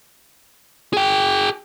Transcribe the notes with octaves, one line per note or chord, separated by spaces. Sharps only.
G#4 G5